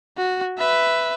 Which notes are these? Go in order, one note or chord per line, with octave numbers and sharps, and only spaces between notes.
F#4
B4 E5